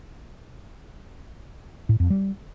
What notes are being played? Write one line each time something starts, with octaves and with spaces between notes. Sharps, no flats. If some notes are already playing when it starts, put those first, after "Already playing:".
A2
F2
G3